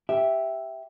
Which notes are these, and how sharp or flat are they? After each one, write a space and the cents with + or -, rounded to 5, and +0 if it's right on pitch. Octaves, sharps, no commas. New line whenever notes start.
G4 +0 E5 +0